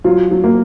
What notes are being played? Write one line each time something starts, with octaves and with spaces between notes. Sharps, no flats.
F#3 F4
F#3
A#3